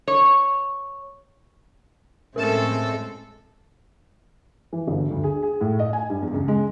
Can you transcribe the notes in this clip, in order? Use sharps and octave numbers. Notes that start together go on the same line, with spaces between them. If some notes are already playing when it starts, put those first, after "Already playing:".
C#5
A2 G#3 A3 C4 C#4 A4 A#4
E3
G1
D2
G#4
G#4
A2
D#5
G#5
G2
E2
C#2
G#3